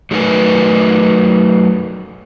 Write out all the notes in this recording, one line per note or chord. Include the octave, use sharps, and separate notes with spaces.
F#3 A3 D#4 A#4 B4 G#5